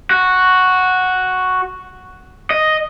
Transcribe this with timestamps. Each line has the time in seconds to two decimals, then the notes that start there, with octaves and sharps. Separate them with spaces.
0.11 F#4
2.50 D#5